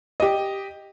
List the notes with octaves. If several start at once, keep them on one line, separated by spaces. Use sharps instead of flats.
G4 D#5